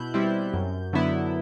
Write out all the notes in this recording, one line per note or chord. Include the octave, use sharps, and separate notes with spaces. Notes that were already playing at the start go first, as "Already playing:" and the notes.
Already playing: B2 E4 F#6 G6
G3 C4 E4
F#2
D3 F#3 B3 E4